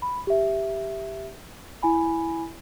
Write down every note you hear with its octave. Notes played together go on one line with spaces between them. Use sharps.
B5
G4 E5
E4 G#5 B5